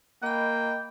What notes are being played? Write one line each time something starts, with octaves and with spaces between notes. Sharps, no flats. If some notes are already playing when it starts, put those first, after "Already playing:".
A#3 D#5 G5 B5